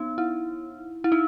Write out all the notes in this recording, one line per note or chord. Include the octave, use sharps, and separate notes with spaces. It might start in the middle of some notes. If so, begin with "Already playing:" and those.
Already playing: B3 D#4
E4
E4
D#4